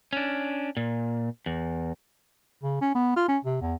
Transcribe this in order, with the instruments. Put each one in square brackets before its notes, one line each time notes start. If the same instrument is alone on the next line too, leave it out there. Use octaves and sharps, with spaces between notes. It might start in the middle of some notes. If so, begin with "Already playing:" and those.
[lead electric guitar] C#4 D4
A#2
E2
[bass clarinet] C#3
C#4
B3
F4
C#4
C3
E2